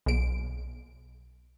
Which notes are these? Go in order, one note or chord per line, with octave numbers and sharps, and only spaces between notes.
B1 D7